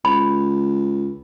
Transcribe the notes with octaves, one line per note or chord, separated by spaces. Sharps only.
C#2 B5